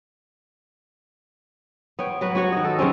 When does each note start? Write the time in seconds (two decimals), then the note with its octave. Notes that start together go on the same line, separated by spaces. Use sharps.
1.99 B3 C#5 G5
2.21 F#3 F#4 B4
2.35 B3 F#4 C#5
2.52 D#3 D#5
2.64 A4
2.79 C#3 F#3 C4 C#4